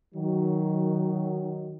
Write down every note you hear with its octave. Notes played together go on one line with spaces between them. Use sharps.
D#3 F#3